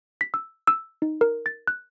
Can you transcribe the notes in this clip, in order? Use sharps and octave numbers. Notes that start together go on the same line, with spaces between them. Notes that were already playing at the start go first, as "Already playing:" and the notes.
B6
E6
E6
D#4
A#4
A6
F#6